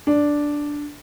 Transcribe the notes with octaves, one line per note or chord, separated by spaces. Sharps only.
D4